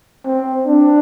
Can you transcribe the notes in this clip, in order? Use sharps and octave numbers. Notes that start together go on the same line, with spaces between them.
C4
D4